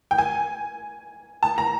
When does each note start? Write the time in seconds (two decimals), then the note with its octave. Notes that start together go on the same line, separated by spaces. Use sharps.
0.11 G5
0.18 G#5
1.43 A5
1.58 A#5